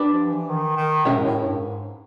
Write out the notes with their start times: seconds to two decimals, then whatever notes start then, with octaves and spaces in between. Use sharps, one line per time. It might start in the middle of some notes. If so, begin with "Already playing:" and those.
Already playing: D4 G4 B4
0.11 F3
0.30 E3
0.49 D#3
0.77 D#3
1.05 B2 G#3 C#4 E4 G4 A#4
1.17 G#2
1.25 A2
1.43 G2
1.57 G2
1.63 G#2